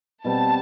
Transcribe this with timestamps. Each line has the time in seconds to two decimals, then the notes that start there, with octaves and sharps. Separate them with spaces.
0.24 B2 G3 C4 A5